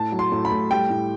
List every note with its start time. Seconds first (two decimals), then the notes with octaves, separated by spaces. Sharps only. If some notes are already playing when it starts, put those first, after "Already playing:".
Already playing: A2 A5
0.12 F#3
0.19 C6
0.32 A2
0.45 B5
0.52 A2
0.71 G3 G5
0.90 A2